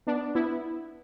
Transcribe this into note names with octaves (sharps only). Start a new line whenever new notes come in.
B3 D4
B3 E4